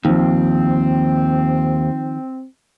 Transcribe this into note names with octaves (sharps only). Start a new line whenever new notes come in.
D#2 D#3 F3 C4